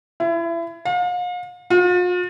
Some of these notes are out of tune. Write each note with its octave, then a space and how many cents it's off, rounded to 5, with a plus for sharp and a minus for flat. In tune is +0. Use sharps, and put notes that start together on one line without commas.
E4 +30
F5 +40
F4 +45